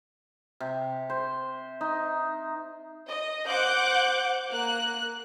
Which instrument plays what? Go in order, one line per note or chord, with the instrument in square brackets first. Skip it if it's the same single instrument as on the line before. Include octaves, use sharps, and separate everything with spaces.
[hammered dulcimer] C3
C5
D#4
[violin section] D#5
C5 F#5 D6 F#6 G6
A#3 F#6